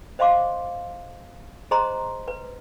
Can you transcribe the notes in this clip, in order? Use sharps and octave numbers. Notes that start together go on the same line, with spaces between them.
C5 D#5 F5 C6 D6
G#4 C5 D#5 A#5 C6
B4